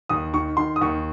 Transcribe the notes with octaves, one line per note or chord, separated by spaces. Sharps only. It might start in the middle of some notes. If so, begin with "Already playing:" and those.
D#2 D#6
D#3 C#6
D#3 C6
D#6
D#2 C#6